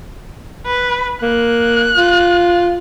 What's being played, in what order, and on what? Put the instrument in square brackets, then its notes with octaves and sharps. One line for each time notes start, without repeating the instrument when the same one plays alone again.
[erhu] B4
[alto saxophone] A#3 [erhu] F#6
[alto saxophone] F4